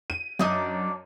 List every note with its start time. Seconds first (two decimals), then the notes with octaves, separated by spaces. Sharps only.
0.10 D#7
0.39 F#2 D4 D#4 D5